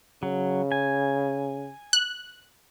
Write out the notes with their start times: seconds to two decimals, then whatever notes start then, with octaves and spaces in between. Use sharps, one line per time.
0.23 C#3 F#3
0.72 G#5
1.93 F#6